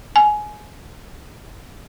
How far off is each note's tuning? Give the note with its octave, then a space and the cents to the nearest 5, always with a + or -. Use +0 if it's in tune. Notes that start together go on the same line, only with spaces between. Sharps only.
G#5 +20